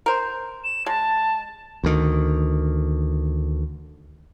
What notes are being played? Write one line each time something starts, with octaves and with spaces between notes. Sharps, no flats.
A#4 C5
E7
G#3 A5
D2 D#3